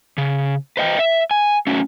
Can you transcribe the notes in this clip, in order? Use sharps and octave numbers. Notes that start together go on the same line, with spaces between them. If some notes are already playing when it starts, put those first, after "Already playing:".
C#3
B4 C5 D#5 F#5 G5
E5
G#5
A3 C#4 F#4